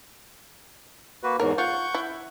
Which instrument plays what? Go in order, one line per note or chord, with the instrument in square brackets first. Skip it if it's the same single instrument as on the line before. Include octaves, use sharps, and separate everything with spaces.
[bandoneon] A#3 F#4 B4
[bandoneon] E2 G#2 [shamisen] A#4 C#5
[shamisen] F4 [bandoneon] F#5 C#6 G6
[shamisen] E4